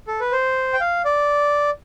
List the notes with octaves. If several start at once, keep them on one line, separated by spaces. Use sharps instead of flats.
A4
B4
C5
G5
F5
D5